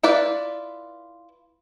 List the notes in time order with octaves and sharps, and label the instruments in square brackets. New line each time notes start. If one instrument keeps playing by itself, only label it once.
[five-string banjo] E4 F4 B4 D5